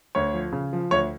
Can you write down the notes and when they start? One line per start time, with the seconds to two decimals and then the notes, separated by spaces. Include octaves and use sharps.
0.15 D2 C#5
0.34 F3
0.52 C#3
0.73 F3
0.91 D2 C#5